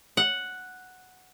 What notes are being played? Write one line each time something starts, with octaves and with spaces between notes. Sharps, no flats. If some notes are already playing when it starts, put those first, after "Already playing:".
F#5